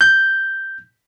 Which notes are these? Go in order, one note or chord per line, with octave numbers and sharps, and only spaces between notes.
G6